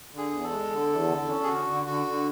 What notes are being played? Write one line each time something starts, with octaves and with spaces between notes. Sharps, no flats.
D3
G#4
E2
A4
G#3
D3
E2
D3
C#4
G#4
D3 F#4
D3
D3 F#4
D3